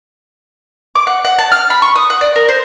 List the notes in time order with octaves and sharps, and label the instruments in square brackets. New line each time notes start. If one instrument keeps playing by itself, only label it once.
[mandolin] D6
F#5
F#5
A5
F6
B5
C#6
D#6
F#5
D5
A#4
C5